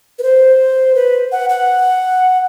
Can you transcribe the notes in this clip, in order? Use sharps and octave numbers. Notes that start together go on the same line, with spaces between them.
B4
C5
B4
F#5
F#5